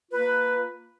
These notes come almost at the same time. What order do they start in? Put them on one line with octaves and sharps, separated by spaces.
F4 B4 A#3